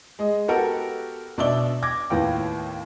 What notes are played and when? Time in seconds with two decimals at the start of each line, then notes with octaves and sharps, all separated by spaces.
0.19 G#3 D#5
0.48 B3 F#4 G4 A4 A#4 F#5
1.38 B2 D4 D5 E5 G7
1.83 D6 G#6 A#6
2.10 D#2 A2 B3 F4 G5